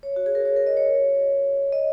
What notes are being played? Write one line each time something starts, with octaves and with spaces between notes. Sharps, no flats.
C#5
F#4
G#4
A#4
C#5
A#4
D#5
C#5
D#5